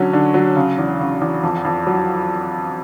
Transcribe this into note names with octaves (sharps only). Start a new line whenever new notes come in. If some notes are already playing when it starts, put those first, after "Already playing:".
Already playing: D3 F#3 C#4
D3
F#3
C#3
E2
C#3
E2
F2
F2
F#3